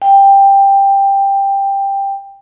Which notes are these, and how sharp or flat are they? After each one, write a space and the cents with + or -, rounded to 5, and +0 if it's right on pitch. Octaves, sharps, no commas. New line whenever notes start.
G5 +10